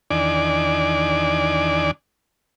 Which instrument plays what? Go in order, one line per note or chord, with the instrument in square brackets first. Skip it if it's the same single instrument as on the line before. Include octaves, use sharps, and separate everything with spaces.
[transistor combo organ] E2 D#3 D4 D5 G#5